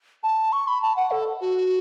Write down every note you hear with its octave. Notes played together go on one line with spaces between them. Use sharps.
A5
C#6
B5
A5
F#5
A4
F#4